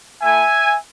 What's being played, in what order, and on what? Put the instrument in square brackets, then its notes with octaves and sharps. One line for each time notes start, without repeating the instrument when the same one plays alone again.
[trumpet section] A3 E4 E5 G#5